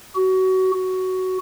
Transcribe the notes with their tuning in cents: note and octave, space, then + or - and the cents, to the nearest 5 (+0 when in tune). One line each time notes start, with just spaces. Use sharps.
F#4 +25
F#4 +10